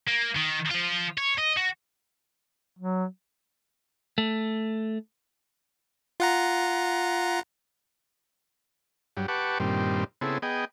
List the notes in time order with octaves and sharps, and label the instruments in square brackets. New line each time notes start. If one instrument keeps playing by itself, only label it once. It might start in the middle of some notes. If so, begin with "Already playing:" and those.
[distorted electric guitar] A#3
D#3
F3 F4
C#5
D#5
F#4
[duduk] F#3
[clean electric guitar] A3
[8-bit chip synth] F4 F#5 A#5
[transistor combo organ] G2 F#3 G3
G4 B4 F#5 A5 C#6 D6
G2 A#2 D#3 G3 C4
C#3 B3 C4 E4 G#4 A4
B3 G#4 D#5 G5